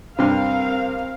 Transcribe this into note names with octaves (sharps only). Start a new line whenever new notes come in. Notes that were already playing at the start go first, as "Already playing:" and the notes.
G2 C3 C4 A#4 F5